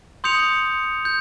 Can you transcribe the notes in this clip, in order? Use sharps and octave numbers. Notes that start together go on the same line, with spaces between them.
C6 D#6 G6 C#7 F7
G6